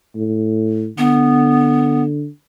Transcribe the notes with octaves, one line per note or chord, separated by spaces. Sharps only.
A2
D3 B3